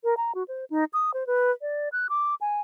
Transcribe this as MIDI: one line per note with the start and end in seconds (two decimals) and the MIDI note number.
0.04 0.14 70
0.17 0.32 82
0.35 0.43 66
0.48 0.65 72
0.70 0.84 63
0.93 1.11 87
1.14 1.26 72
1.27 1.51 71
1.62 1.89 74
1.92 2.07 90
2.09 2.35 86
2.41 2.61 80